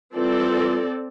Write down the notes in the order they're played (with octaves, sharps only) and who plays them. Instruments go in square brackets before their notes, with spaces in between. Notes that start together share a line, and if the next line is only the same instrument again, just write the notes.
[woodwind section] E3 G3 F4 [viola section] C4 A4 D5